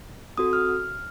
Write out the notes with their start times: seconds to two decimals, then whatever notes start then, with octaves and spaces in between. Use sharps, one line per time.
0.37 C4 F#4 A4 D#6
0.53 F6